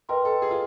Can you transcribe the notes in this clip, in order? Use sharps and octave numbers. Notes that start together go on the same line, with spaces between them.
A#4 B4 D#5 G5 C6
A4
G#4
F4